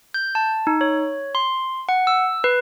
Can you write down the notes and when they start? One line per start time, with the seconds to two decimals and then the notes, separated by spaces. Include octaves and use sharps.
0.14 G6
0.35 A5
0.67 D#4
0.81 C#5
1.35 C6
1.89 F#5
2.07 E6
2.44 B4